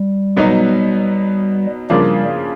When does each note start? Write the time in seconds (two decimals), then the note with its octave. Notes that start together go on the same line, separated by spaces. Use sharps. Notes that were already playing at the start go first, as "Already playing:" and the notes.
Already playing: G3
0.37 B2 F#3 B3 D#4
1.90 C#3 F3 G3 A#3 D4